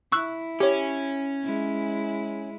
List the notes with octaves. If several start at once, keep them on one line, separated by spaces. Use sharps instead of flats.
E4 C#6 E6 F#6
C#4 G4 C#5
G#3 E4